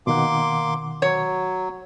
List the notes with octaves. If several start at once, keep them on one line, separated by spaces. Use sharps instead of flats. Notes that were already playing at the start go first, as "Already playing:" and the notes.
B2 D#3 A#3 F#5 C6 D6
F#3 C#5